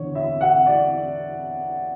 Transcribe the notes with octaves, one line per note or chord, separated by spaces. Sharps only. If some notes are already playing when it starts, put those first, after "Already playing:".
Already playing: E2 D3 C#5
E5
F#5
D5